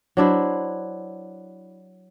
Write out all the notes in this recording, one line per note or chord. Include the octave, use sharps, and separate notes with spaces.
F#3 D4 E4 C5